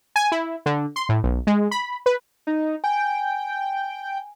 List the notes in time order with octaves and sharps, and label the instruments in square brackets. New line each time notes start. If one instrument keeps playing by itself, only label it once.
[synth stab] G#5
E4
D3
C6
A2
B1
G#3
B5
B4
[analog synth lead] D#4
[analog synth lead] G5 [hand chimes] G#5